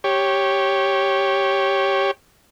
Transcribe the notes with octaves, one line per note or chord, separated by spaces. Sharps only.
G4 C#5